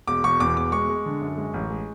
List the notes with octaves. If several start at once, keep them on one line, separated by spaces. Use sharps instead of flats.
E1 D6
E1 C#6
E2 D6
E1 D6
G#3 C#6
G#3
D3
F#2
G#3
A1
G#3